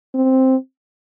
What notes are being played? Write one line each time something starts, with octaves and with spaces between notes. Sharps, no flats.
C4